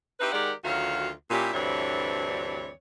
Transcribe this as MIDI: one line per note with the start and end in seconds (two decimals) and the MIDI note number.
0.20 0.29 60
0.20 0.29 63
0.20 0.29 64
0.20 0.29 67
0.20 0.29 71
0.32 0.52 51
0.32 0.52 56
0.32 0.52 67
0.32 0.52 70
0.32 0.52 74
0.32 0.52 78
0.64 1.09 38
0.64 1.09 51
0.64 1.09 54
0.64 1.09 65
0.64 1.09 66
0.64 1.09 77
1.31 1.50 46
1.31 1.50 61
1.31 1.50 62
1.31 1.50 64
1.31 1.50 67
1.53 2.69 38
1.53 2.69 43
1.53 2.69 52
1.53 2.69 60
1.53 2.69 73
1.53 2.69 74